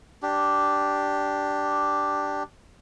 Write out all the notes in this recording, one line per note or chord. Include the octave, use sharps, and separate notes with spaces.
D4 G4